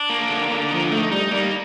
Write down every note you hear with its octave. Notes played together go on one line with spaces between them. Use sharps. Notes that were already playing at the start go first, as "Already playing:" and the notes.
Already playing: D4
A#3
D3
D3
F3 D#4
A3 D#4
G3 D#4
G3 A#3